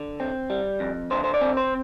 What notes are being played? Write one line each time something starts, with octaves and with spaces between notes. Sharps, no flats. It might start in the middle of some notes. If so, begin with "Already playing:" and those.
Already playing: D3
C4
G3
F2
D3 C5
C5
D5
C4
C5